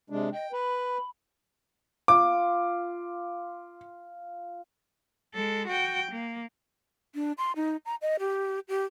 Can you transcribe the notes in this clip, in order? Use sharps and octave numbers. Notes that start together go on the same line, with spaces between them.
C3 G#3 D4
D#5 G5
B4 B5
F4 D6
G#3 A4
F#4 G5
A#3
D4
C6
D#4
A#5
D#5
G4
G4